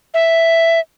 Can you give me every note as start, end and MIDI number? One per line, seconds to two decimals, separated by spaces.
0.14 0.80 76